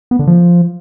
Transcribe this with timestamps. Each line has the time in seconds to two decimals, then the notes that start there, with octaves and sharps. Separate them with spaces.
0.11 B3
0.19 D3
0.27 F3